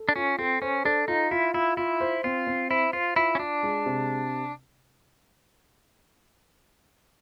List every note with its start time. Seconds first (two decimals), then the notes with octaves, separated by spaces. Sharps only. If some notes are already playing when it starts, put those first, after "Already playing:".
Already playing: A4
0.09 D4
0.16 C#4 F4
0.39 C4 A4
0.62 C#4 C5
0.85 D4 A4
1.08 D#4 F4
1.31 E4 F4
1.54 E4 F4
1.77 E4 F4
2.01 C5
2.24 C4 F4
2.47 C4
2.70 E4 C5
2.93 F4 C5
3.16 E4 F4
3.35 C#4
3.40 D4 F4
3.63 G#3
3.86 C3